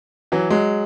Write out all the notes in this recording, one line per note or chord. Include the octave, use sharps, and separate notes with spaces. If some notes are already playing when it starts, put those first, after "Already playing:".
E3 F#3
F#3 G#3